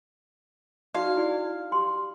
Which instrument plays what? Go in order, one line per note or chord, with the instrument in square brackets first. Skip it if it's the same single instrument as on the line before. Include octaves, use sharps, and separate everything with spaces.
[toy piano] D#4 F#4 D5 [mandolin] F5
[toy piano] E4 G#4 D5
G4 C6